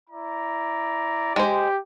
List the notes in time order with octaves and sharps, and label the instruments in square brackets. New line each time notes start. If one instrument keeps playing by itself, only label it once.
[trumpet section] E4 D5 A#5
[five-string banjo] G#3 C5 [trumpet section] G4